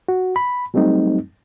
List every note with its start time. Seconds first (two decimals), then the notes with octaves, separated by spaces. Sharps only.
0.08 F#4
0.36 B5
0.74 F#3 G3 A3 C4 D#4